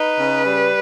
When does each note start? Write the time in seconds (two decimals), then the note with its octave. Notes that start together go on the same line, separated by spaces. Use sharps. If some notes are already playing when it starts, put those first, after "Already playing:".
Already playing: D#4 B4
0.18 C#3
0.44 G3